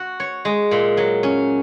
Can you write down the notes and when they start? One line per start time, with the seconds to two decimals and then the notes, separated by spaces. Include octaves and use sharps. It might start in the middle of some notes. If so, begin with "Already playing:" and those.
Already playing: F#4
0.20 C#5
0.45 G#3
0.71 A#2
0.97 F#3
1.23 C#4